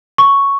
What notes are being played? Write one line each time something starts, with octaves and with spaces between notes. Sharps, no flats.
C#6